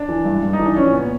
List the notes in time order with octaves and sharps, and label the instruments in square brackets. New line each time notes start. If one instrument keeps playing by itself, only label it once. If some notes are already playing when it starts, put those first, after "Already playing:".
Already playing: [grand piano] D4
E3
G2
G2
D#4
E3
D4
F3 C#4
A#2 B3